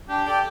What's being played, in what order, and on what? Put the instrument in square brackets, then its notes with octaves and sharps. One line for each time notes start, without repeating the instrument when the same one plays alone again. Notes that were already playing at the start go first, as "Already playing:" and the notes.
[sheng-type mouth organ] D4 [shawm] G4
[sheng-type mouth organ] A4 D5 G5